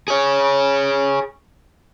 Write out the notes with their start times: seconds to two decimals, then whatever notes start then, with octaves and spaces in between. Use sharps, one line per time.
0.08 G#4 C#5